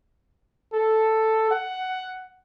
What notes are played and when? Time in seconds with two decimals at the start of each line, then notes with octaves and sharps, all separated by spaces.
0.73 A4
1.51 F#5